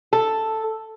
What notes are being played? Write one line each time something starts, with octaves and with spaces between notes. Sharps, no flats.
A4